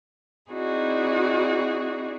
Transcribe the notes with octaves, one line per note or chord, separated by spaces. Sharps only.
C4 D#4 E4 F#4 G#4 D5